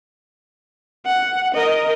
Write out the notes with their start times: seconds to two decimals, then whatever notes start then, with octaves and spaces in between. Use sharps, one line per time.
1.05 F#5
1.55 A#4 D#5